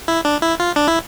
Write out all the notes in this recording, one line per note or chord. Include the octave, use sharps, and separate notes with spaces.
E4
D4
E4
F4
D4
E4